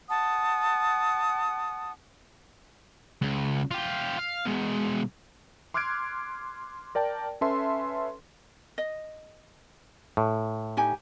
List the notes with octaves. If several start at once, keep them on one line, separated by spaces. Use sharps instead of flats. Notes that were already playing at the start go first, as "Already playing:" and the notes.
F#5 A5 D#6
C#2
F4 G4
F5
B2 G#3
C6 D6 F6 F#6 G#6 D7
A#4 D5 G5 A5
C#4 A4 B4 E5 A5 C6
D#5
A2
D#4 G4 G#5